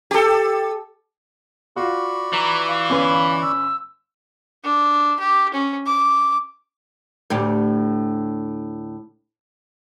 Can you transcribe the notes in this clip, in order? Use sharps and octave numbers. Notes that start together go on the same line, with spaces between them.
G4 A4
F4 F#4 D5 B5 C#6
E3 A#5
F5
G1 C#4 B4
E6
D4
G4
C#4
D6
D2 A2 G4